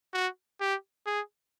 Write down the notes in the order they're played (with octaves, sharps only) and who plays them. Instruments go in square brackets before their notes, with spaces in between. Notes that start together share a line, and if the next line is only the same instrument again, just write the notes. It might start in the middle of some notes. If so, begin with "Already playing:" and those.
[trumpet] F#4
G4
G#4